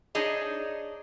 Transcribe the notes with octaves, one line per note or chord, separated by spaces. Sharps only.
D4 D#4 G#4 C#5 D#5